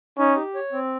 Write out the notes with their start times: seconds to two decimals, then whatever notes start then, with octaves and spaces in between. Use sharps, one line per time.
0.18 C#4 D#4
0.36 G4
0.55 C#5
0.73 C4